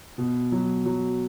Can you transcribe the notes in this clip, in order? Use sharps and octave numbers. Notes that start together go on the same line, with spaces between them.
B2
F#3
F#3